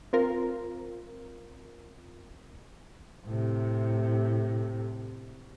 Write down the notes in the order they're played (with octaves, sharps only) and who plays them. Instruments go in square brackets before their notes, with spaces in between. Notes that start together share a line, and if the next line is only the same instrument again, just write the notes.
[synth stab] C4 F4 A#4
[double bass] A2 C3